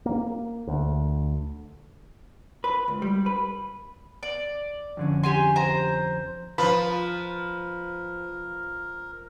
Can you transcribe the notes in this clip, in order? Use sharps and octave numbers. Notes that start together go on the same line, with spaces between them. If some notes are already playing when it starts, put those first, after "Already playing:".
A#3
D2
B4
C#2
G3
B4
D5
F2 D3 C#4
G4 G#5 C6
C5 A#5
F3 A#4 B4